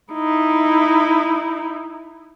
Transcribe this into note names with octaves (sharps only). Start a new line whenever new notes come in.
D#4 E4